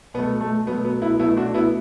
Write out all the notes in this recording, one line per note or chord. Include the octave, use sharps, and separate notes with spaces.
B2 F#3 A3 B3
A3
B2 F#3 A3 B3
B3
B3 E4
B2 F#3 A3 B3 E4
D4 F#4
B3 E4